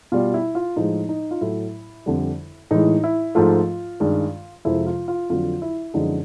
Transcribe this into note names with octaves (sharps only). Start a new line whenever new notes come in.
B2 G3 F4
E4
F4
A2 F3 G#3 D#4
D#4
F4
A2 F#3 A3 E4
F2 D3 G3
A2 E3 G#3 D#4
E4
G#2 F3 A3 F4
G2 D#3 G#3
F2 C3 F3 G#3 E4
F4
F4
F2 D3 F#3 F4
E4
F#2 D3 F3 G#3 D#4